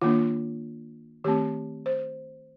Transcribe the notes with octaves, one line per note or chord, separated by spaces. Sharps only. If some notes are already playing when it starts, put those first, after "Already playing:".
D#3 A#3 D4 F4
D#3 A3 C4 G4
C5